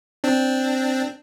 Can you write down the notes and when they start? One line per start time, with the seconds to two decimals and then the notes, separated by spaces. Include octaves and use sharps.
0.24 C4 D4